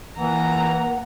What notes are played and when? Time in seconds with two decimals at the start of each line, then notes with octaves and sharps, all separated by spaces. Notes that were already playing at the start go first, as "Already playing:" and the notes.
0.18 E3 A#3 F#5 A#5